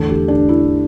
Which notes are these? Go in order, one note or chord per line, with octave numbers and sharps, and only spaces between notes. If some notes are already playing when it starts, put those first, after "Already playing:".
Already playing: E2 D3 A3 A4
G4
D4
E4